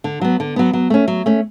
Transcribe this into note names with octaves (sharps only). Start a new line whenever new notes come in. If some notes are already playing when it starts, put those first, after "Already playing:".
D3
F#3 B3
D3
F#3 B3
F#3
A3 C#4
F#3
A3 C#4